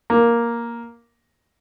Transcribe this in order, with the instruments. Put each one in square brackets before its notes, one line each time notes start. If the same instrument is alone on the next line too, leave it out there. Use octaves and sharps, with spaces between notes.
[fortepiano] A#3